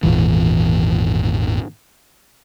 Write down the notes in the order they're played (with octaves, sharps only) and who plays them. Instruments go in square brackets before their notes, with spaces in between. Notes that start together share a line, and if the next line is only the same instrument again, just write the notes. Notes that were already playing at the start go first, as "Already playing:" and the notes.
[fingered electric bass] G#1 E2 A#2 E3